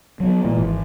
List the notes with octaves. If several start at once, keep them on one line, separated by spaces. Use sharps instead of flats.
F#3 B3
A#2 E3 G#3
G#1